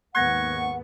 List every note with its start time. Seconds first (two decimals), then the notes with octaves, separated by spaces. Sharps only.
0.15 D#2 G#2 B3 F#5 C#6 F#6 G#6 A#6